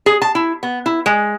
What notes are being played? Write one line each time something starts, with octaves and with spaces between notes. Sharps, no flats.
G#4
A5
E4
B3
E4
G#3